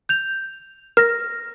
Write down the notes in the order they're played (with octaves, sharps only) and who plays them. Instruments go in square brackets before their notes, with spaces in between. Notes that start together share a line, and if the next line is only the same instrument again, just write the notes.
[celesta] G6 F7
[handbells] A#4 [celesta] F6 A#6